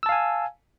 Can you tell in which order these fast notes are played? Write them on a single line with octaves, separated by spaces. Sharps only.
E6 A5 F5 G#5